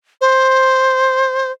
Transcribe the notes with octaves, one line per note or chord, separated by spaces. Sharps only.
C5